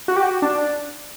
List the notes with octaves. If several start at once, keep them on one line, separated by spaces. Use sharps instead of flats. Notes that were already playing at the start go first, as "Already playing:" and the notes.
F#4
G4
F#4
D4